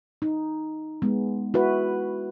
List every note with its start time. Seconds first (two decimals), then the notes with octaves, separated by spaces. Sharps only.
0.22 D#4
1.02 G#3 B3
1.54 E4 F#4 B4